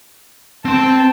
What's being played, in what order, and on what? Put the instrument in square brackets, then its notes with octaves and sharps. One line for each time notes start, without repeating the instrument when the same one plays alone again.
[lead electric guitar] C4 C6 [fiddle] G5 A5